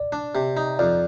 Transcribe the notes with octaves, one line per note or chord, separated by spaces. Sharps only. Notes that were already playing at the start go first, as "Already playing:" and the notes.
Already playing: D5
D4
C3
D#4
F2 D5